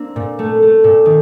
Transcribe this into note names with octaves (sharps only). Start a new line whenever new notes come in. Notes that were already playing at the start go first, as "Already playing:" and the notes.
Already playing: A#3 C4 D4
A#2
A3
A3
A#2
D#3